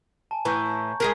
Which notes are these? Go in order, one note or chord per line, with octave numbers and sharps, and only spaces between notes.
G#5 A5
A2 E3 A#5 C#6 G6
G#3 G#4 A#4 G#6 B6 C7